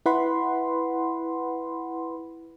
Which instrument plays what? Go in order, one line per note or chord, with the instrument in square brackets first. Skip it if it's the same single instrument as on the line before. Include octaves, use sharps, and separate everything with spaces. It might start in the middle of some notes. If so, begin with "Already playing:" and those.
[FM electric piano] E4 B4 F#5 B5 C6